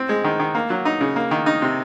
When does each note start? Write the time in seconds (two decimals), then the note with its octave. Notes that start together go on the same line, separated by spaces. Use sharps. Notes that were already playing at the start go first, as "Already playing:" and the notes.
Already playing: C4
0.09 G#3
0.24 D#3
0.40 D#3
0.55 A#3
0.70 F#3
0.85 D#4
1.01 C#3
1.16 A#3
1.31 D#3
1.46 D#4
1.62 C3